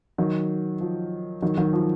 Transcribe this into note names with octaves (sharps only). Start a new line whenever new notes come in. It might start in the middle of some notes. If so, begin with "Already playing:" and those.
D#3 F#3
F3
D#3 F#3
D#3 F#3
F3